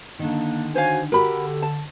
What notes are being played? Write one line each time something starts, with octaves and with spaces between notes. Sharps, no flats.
D3 D#3 A#3 D4
F#4 C5 C#5 F5 G#5
D3 F#4 G4 A#4 B5
A5